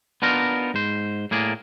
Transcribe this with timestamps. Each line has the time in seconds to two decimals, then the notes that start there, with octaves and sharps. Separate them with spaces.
0.22 B3 D4 D#4 F4 A#4
0.74 G#2 C5
1.31 A2 A#3 G#4 D5